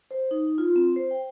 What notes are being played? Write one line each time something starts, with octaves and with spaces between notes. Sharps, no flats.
C5
D#4
F4
C4
C5
G5